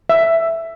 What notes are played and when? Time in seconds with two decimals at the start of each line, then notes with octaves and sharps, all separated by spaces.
0.09 E5